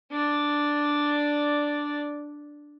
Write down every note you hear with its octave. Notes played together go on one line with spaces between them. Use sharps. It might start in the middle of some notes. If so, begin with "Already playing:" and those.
D4 D5